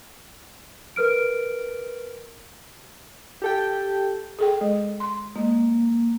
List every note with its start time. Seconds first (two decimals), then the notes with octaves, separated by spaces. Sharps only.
0.96 A#4 B4 F6 D7
3.42 G4 A4 G5
4.39 G#4 A4 G5
4.61 G#3
5.00 C6
5.36 G#3 A#3